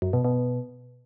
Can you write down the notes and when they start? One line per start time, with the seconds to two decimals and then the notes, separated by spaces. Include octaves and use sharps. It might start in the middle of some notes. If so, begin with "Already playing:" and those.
0.02 F#2
0.13 B2
0.24 B2